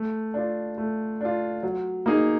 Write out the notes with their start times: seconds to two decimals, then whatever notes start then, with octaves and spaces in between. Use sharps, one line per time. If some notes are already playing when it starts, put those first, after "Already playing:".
Already playing: A3
0.34 D4 F4
0.78 A3
1.21 D4 F4
1.63 F#3
2.06 A#3 D#4 G#4